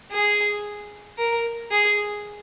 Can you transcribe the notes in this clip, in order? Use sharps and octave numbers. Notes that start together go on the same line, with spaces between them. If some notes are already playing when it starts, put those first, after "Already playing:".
G#4
A#4
G#4